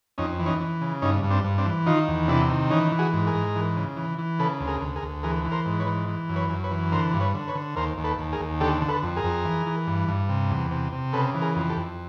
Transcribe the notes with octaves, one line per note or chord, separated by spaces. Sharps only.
F2 C#4 D#4
E3
C#4 D#4
E3
C#3
G2 C#4 D#4
G2
C4 D4
G2
C4 D4
E3
D#3 D#4 F4
E2
C3 D4 E4
D#3
E3 C#4 D#4
E3
F#4 G#4
G#2
G#4 A#4
G#2
E3
C#3
E3
E3
C#3 A4 B4
D2
G#4 A#4
D2
G#4 A#4
D2
E3 G#4 A#4
E3
A#4 C5
G#2
B4 C#5
E3
E3
F#2
B4 C#5
F#2
B4 C#5
E3
D3 A#4 C5
G2
B4 C#5
D3
B4 C#5
D3
D#2 A#4 C5
D#2
A4 B4
D#2
G#4 A#4
D#2
D3 G4 A4
D3
A4 B4
F2
G#4 A#4
F2
E3
E3
G2
G2
C3
E2
C3
C3
C#3 A4 B4
E3
G#4 A#4
F2
G4 A4
F2